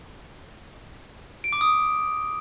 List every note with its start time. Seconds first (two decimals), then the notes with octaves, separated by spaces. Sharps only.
1.44 D7
1.53 D6
1.61 D#6